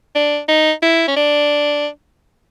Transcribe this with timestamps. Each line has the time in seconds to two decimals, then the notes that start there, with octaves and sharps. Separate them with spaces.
0.15 D4
0.48 D#4
0.82 E4
1.08 C#4
1.16 D4